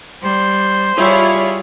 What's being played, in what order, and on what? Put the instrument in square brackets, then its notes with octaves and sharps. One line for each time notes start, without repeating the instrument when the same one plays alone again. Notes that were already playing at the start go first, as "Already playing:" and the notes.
[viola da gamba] G3 [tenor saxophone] C5
[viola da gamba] G3 G4 G#4 [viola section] E4 F4 C#5